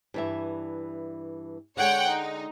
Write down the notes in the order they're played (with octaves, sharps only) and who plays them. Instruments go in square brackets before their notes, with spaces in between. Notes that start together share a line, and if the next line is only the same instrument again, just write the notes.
[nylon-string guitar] G2 E3 E5
[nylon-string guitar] D3 G#3 [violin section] C#5 F#5 G5
[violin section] D#4